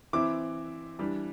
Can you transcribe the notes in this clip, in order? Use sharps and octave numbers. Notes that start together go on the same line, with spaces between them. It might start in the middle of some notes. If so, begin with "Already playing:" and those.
E3 C4 E4 D6
E3 G3 D4